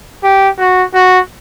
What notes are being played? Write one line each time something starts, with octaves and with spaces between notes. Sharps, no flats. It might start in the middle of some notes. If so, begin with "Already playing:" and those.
G4
F#4
F#4